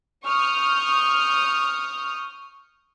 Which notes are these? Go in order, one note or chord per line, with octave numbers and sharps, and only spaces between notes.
C#6 D#6 F6 G6